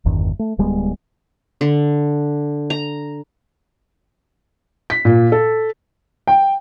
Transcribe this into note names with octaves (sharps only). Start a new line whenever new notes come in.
G1 E2 G2 D#3
A3
D1 G3 G#3 B3
D3
A#5
B6
A#2
A4
G5